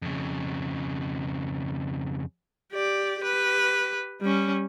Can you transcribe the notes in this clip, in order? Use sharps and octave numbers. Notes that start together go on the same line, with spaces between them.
F2 C#3
G4 D5
G4 B4
G3 C#4